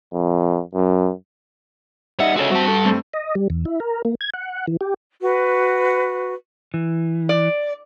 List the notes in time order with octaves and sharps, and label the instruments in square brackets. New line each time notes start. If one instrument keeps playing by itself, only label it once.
[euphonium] F2
F#2
[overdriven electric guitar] G3 D#4 [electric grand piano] E5 [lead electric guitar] F#5
[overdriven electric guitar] G#3 C#4 [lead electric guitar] F#4 A4
[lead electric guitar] G3 A5 [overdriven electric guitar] C4 [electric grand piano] F#4
[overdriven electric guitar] A4
[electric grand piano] G2 A3 C4
[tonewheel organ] D#5
G3
E2
E4
A#4
A#3
G#6
F#5
E3
G4
[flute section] F#4 B4
[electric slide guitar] E3
[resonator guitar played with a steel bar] D5